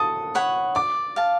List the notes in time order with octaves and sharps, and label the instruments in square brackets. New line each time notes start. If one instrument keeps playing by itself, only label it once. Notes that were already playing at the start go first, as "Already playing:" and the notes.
Already playing: [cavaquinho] A4 [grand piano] D#6
[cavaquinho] C#5 F#5 B5
[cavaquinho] D5 [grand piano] D6
[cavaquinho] F5 A5